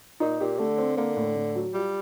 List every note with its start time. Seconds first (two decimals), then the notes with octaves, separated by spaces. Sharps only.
0.20 A#2 D#4
0.40 A#2 G4
0.59 D3 A3
0.78 C4
0.97 D3 A#3
1.17 A2
1.36 A2
1.55 F#3
1.74 G3 F4